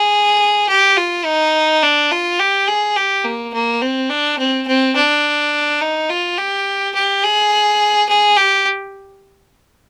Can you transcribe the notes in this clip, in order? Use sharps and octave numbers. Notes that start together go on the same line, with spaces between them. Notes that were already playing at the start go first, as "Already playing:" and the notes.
Already playing: G#4
G4
F4
D#4
D4
F4
G4
G#4
G4
A#3
A#3
C4
D4
C4
C4
D4
D#4
F4
G4
G4
G#4
G#4
G4